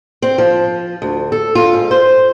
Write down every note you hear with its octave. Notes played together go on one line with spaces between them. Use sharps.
C4
F3
D2
A4
F4
G#2
C5